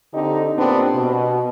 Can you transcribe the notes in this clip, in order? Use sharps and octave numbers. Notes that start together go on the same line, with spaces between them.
D3 C4 D#4 G4 A4
A#2 B3 C4 D4 G4
B2